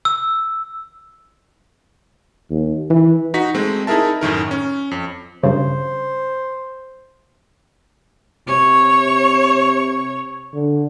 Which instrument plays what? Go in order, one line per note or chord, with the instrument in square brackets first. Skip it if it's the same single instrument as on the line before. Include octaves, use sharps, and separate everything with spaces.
[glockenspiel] E6
[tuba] D#2
E3
[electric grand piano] D#4 F#4 B6
G#3 A3 C4
D#4 E4 G#4 A#4 E5 A5
F#2 A2 D#3 A#4
C#4
F2
[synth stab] G2 C#3 [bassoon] C5
[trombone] C3 [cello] C#5
[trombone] D3